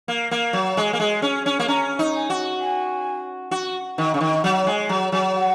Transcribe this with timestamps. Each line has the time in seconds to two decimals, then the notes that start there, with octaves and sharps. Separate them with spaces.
0.08 A#3
0.31 A#3
0.53 F#3
0.77 G#3 G#5
0.93 A#3
1.00 G#3
1.22 C#4
1.46 C#4
1.59 A#3
1.68 C#4 A#5
1.99 D#4
2.15 G#5
2.30 F#4
2.60 G#5
3.51 F#4
3.98 D#3
4.14 C#3
4.21 D#3
4.44 F#3 F#5
4.67 G#3 G#5
4.89 F#3 A#5
5.12 F#3 G#5
5.35 F#5